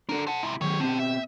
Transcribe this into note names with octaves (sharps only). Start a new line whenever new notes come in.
D4 F#4 A4 A#4
C5 F#5 A5
G#2 C3 E4
C3 D#3 F#3 G#4 C#5
B2 D3 C4
E5